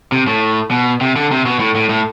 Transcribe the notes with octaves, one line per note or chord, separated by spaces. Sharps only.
C3
A2
B2
C3
D3
C3
B2
A2
A2
A2